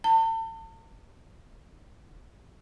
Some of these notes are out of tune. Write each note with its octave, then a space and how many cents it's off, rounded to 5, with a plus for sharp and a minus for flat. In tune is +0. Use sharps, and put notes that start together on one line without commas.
A5 +40